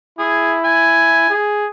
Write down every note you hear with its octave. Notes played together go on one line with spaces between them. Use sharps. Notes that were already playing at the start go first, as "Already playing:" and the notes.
E4 G#4
G#5
G#4